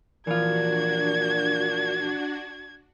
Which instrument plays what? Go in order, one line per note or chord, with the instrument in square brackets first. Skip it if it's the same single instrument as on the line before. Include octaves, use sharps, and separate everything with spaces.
[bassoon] A#2 [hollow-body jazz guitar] E3 F3 F4 [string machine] D4 F#4 [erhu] G#6